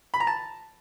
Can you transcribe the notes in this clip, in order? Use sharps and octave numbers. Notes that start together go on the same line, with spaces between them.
B5
A#5
A5